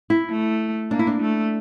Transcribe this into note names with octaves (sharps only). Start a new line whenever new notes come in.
E4
A3
A#3 D4
E4
D4
A3